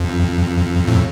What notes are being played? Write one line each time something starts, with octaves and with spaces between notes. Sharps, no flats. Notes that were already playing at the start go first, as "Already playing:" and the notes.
Already playing: F2
A2